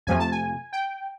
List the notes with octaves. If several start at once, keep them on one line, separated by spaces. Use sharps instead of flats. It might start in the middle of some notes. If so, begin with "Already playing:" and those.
F2 C3 F3 A3 G#5
A5
G#5
G5